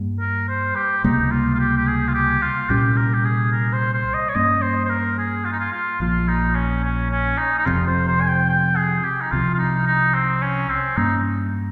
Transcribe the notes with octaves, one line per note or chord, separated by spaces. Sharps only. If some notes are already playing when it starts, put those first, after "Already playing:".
Already playing: G2 G3 A#3
A#4
C5
G4
C#2 C3 G3 A#3 D#4
F4
F4
G4
G4
G#4
F4
G4
F4
C2 A#2 G3 C#4 G4
A#4
G4
G#4
A#4
C5
C5
D#5
C#5
G2 G3 A#3 C#4 D#5
C5
C5
A#4
G#4
F4
D#4
F4
F4
A#1 A#2 F3 F4
D#4
C#4
C#4
C#4
D#4
D#4
F1 F2 C3 F4
C5
C5
G#5
G5
G5
G#4
G4
D#4
C2 C3 F3 F4
F4
D#4
D#4
C4
C#4
C4
G2 G3 A#3 C#4 D#4